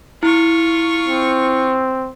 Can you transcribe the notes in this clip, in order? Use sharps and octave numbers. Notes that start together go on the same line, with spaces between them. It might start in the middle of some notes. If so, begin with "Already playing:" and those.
E4 F4 C#6
C4